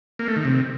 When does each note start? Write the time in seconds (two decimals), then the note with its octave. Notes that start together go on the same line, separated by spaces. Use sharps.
0.19 A#3
0.28 A3
0.36 D#3
0.45 C3